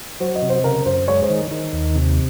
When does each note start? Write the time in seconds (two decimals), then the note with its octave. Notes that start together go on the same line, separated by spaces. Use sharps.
0.20 F#3 C5
0.35 D#5
0.42 C3
0.49 C5
0.64 C#3 A#4
0.86 F#2 C5
1.08 G#3 C#5
1.23 C5
1.29 D#3
1.51 D#3
1.73 D#2
1.96 C3